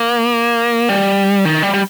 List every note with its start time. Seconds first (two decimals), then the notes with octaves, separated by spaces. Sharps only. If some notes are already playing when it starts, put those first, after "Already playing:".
Already playing: A#3
0.89 G3
1.45 D#3
1.63 G3
1.74 G3